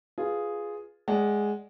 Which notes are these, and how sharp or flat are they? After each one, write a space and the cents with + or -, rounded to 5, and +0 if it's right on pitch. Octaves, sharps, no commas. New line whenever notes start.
F4 +0 G#4 +0 B4 +0
G#3 +0 D5 -10 F#5 +15